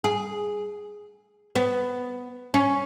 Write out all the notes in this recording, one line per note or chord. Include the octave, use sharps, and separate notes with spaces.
G#4
B3
C#4